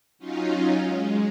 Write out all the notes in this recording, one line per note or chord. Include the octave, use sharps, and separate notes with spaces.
F#3 C#4 D#4 F4
G#3